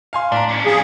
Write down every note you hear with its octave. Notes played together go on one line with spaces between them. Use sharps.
F5 G#5 C6 F6
A2 D4 D5 A#5 B6
C#4 D4
F3 F4 G#4 F5